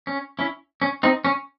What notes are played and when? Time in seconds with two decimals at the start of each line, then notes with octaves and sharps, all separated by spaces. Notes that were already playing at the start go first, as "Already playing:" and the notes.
0.07 C#4
0.39 C#4 E4
0.82 C#4
1.03 C4 D#4
1.25 C#4